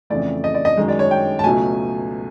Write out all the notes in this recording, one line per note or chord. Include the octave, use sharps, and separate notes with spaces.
F2 C#3 E3 A3 D5
D#5
D5
D#5
F#2 D#3 G#3
D5
C#5
G5
A5
C#2 B2 F#3 A3 G#5